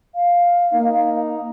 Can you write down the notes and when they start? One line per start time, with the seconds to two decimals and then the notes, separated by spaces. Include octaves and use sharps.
0.15 F5
0.73 A#3 D#4